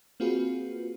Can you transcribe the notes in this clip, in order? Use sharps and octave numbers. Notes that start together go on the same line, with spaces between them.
A#3 C4 F4 F#4 G#4 B4